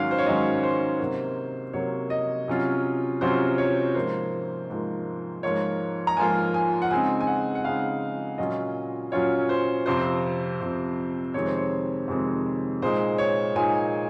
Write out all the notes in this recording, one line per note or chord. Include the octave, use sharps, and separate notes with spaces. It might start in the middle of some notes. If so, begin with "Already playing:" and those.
Already playing: G#2 D#3 F#3 C#4 F5
C5
C#5
G#2 D#3 F#3 C#4 D#5
C5
C3 F#3 A#3
C3 F#3 A#3 C#5
D#5
C3 F#3 C#4 F4
C3 F#3 C#4 F4 C5
C#5
G#2 F3 A#3 C5
G#2 F3 A#3
G#2 F3 A#3 F4 C#5
A#5
G#2 F3 A#3 F4 G#5
G#5
F#5
C#3 G#3 C4 D#4 G#5
G#5
F#5
F#5
C#3 G#3 C4 D#4 F5
A#2 F#3 C#4 F4 D#5
A#2 F#3 C#4 F4 C#5
C5
F2 C3 F3 C4 C5
F2 C3 F3 C4
F2 C3 D#3 G#3 C4 C#5
C5
C#5
F2 C3 D#3 G#3 C4
A#2 G#3 D#4 C5
C#5
A#2 G#3 D#4 G#5